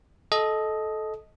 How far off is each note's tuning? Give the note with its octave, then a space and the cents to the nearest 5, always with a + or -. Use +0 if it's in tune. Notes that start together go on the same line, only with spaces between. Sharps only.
A4 -20 D#5 +5